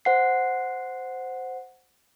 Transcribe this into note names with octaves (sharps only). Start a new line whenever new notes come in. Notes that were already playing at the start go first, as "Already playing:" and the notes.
C5 F#5 C7